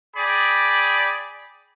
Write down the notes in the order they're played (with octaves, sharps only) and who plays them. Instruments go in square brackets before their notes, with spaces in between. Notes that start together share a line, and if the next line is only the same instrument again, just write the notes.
[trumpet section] G#4 D5 G5 B5